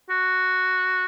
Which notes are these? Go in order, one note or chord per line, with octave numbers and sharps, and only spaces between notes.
F#4